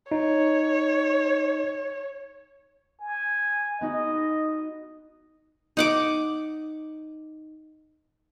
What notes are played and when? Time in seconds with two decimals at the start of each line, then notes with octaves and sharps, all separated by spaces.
0.12 D#4 C#5
3.00 G#5
3.81 B3 D#4 F#4 D#5
5.77 D#4 F#5 D6